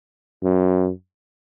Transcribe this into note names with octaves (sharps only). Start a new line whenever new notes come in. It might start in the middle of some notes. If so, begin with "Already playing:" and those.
F#2